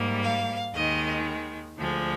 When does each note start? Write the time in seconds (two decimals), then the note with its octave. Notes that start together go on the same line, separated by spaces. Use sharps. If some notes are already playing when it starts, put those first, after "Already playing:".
Already playing: G#2 G3 A#3
0.23 F5
0.74 D#2 D#3 G#3 D#5
1.77 D2 D3 F3 G#3